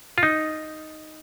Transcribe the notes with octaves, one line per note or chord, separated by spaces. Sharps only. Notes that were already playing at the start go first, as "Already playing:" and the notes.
F4
D#4